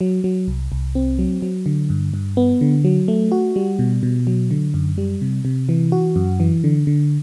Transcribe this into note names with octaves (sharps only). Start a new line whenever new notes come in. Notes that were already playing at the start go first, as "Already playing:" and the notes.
F#3
F#3
C2
C2
C4
F#3
F#3
D3
G2
G2
B3
D3
F#3
A3
F#4
G3
B2
B2
F#3
D3
F#2
G3
C3
C3
E3
F#4
F#2
E3
D3
D3